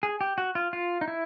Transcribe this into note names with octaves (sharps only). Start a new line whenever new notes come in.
G#4
G4
F#4
F4
F4
D#4
E4